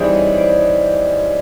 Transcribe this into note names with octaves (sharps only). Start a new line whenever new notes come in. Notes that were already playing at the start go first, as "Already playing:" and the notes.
Already playing: E3 G3 C4 D#4 G#4 D5 E5
C#5 D#5
C5 D5